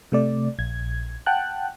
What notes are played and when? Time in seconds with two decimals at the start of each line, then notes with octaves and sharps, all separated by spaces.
0.12 C3 A3 D5
0.59 A#1 G#6
1.26 F#5 G5 A5 F#6